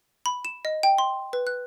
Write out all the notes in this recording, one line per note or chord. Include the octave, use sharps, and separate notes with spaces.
B5
E7
D#5
G5
C6
B4
F#6